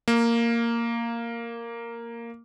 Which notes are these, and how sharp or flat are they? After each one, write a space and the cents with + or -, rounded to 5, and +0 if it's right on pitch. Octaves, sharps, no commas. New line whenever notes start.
A#3 -5